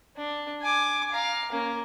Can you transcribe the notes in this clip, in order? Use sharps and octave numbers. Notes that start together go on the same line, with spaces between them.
D4
G#5 D6
F5 A#5
A#3 C#4